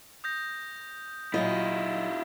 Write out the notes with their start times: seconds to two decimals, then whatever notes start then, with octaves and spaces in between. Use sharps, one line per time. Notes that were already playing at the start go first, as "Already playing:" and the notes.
0.24 D#6 G6 A#6
1.34 A#2 F#3 E4 F4 D#5